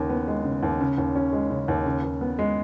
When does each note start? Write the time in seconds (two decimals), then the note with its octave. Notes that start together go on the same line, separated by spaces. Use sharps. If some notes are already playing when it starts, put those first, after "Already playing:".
Already playing: D#2 C#3
0.09 B3
0.28 G#3
0.44 C#3
0.63 D#2
0.80 C#3
0.98 D#2
1.15 C#4
1.33 G#3
1.50 C#3
1.68 D#2
1.86 C#3
2.03 D#2
2.21 B3
2.39 G#3